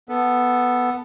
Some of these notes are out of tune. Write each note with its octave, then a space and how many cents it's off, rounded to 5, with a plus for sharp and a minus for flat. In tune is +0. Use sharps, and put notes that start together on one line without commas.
B3 +0 A4 +0